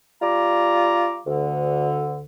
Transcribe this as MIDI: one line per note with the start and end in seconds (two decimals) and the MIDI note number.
0.22 1.19 55
0.22 1.19 65
0.22 1.19 82
0.22 1.19 86
1.27 2.25 38
1.27 2.25 50